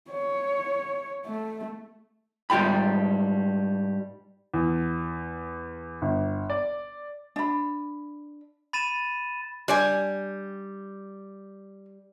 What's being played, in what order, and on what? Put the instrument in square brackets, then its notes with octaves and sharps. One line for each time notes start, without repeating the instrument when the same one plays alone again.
[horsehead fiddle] C#5
A3
[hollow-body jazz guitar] G#2 G3 F4 G5 B5
[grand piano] E2
G1
D5
[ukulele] D4 B5
[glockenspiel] B5 A6 D#7 E7
[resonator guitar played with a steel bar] G3 [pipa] D4 D5 G#5